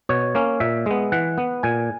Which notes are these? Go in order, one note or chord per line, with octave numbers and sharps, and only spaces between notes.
B2 C#5
A#3 C#4
A#2 E5
G#3 B3
E3 F#5
B3
A#2 G#5